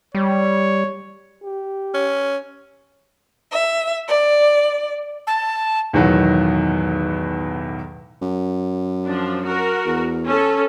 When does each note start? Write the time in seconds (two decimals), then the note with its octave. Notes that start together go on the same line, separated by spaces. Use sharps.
0.15 G3 C#5
1.43 G4
1.94 C#4
3.52 E5
4.09 D5
5.27 A5
5.93 B1 E2 A2 D#3 E3 F#3
8.22 F#2
9.04 F3 D4
9.42 F#4 A#4
9.86 E2
10.25 C#4 A4